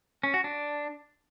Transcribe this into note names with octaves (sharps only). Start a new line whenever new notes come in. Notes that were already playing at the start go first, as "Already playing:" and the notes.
C#4
F#4
D4